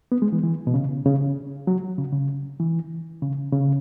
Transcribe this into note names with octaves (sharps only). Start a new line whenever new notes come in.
B3
G#3
E3
E3
B2
C#3
C#3
F#3
C#3
C#3
E3
C#3
C#3